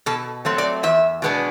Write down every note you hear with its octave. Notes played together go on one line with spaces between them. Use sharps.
B2 A4
F#3 A3 C4
D5
E2 E5
B2 G#3 B3 D4